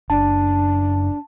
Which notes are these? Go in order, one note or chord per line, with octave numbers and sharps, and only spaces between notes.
F#1 D4 A5